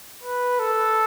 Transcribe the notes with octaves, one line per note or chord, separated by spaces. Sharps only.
B4
A4